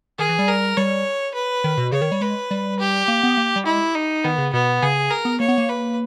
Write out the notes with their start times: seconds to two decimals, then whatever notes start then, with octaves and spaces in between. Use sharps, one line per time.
0.19 D#3 G#4
0.29 E3
0.39 G3
0.48 A#4
0.77 G3 C#5
1.34 B4
1.64 D#3
1.77 B2
1.92 C#3 C#5
2.02 D#3
2.12 G3
2.21 G#3 B4
2.51 G3
2.80 G4
3.08 A#3
3.23 B3
3.37 A#3
3.56 G3
3.66 G#3 E4
3.95 D#4
4.24 D#3 B3
4.38 C#3
4.53 B2 B3
4.82 C#3 G#4
5.11 A#4
5.25 B3
5.40 A#3 C#5
5.48 B3
5.58 A#3
5.69 B4